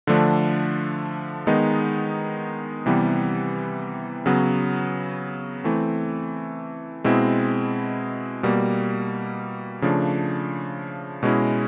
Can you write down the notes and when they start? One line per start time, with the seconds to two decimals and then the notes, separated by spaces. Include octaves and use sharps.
0.07 D3 F3 A3 D4
1.47 D#3 G#3 B3 D#4
2.86 C3 E3 G3 B3
4.26 C#3 F#3 B3
5.64 E3 A3 C4
7.04 B2 G#3 C4 E4
8.43 B2 G3 A#3
9.82 C#3 F3 A3 D4
11.23 B2 G#3 C#4 E4